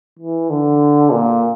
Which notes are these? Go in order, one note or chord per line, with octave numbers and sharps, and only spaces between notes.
E3
D3
A#2